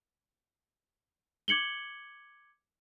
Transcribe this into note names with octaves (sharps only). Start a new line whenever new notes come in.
D6 G#6 C#7 F#7 G7